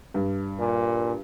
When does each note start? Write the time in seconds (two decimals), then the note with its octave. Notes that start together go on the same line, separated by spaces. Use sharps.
0.14 G2
0.59 A#2